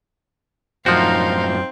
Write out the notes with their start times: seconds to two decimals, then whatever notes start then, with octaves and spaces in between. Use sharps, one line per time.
0.86 F#2 A2 F3 C4 D#4 F#4 F5